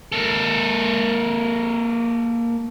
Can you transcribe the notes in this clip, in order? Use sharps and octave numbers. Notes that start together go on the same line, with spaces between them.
A#3 A4